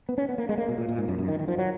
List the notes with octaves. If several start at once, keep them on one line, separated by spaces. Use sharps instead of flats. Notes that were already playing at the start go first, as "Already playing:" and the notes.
B3
C#4
B3
A#3
G#3
A#3
B2
A#2
A#2
G#2
F#2
F#2
D#3
D#3
F3
F#3